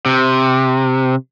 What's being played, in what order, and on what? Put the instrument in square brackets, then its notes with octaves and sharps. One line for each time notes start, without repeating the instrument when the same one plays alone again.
[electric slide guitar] C3